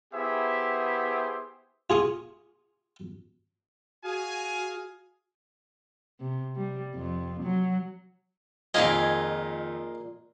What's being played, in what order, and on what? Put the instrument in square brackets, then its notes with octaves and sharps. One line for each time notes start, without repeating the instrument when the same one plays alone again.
[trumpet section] B3 E4 G4 G#4 C5 E5
[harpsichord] F4 G#4 C#6 D#6
[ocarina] F#4 [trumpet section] G#4 F5 G#5
[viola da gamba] C3
G3
F2
F#3
[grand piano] F2 D#3 [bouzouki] A#2 G#4 G#5 [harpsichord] F4 D#5